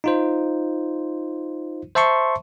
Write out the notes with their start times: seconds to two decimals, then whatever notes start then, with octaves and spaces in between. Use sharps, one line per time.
0.04 D#4 F4 C5
1.95 C5 E5 A5 C6 C#6